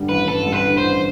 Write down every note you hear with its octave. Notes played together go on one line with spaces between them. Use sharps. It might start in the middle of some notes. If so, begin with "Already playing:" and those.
Already playing: G2 D3 G3
A1 B4
G2 A4
G3
B4
D3
C5
A1